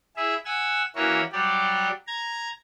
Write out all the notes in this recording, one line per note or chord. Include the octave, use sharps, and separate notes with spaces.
E4 G#4 E5
F#5 G#5 E6
E3 A#3 C#4 E4 F#4 C#5
F#3 G3 G4 D5
A#5 G#6